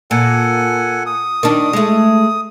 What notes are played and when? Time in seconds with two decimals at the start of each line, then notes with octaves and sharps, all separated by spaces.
0.11 A#2 A4 F#5 G#5
1.06 D#6
1.43 D#3 D4
1.73 G#3 A3